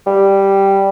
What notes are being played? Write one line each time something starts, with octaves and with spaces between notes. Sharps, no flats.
G3